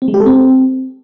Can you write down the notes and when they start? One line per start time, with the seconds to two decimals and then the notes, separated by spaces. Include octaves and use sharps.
0.02 C4
0.08 G#3
0.14 G4
0.20 A4
0.26 C4